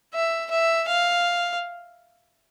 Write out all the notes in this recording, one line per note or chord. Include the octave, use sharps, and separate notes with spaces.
E5
E5
F5